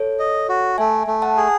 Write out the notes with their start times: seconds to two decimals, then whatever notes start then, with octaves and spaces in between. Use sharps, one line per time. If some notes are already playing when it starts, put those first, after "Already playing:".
Already playing: A4 C#5
0.19 D#5
0.49 F#4
0.78 A3 E5 G#5
1.07 A3
1.22 F#5 A5
1.37 G#4